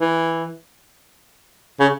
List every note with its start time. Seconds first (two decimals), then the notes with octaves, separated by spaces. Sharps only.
0.01 E3
1.80 C#3